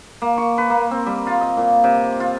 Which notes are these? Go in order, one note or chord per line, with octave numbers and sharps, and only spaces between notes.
A#3
C#6
B4
A#3
C4
G3
F4
D#5
A#2
C3
F4